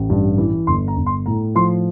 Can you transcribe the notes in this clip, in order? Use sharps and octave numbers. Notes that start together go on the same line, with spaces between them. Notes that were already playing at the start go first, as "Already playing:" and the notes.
Already playing: A1
G2
E3
G1 C6
A#5
G1
C6
A2 A#5
F3 C6